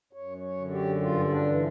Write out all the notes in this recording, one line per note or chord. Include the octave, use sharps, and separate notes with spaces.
F#2 C#5
C#5
D3
G4
G2 F4
D4
E3